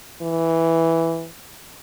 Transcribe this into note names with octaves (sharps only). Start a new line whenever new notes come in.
E3